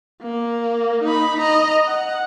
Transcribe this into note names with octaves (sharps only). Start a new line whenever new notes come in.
A#3
D#4 B5
D#5 A#5
F#5